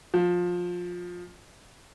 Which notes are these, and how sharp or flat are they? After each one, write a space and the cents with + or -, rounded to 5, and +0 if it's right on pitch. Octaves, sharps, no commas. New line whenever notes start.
F3 +20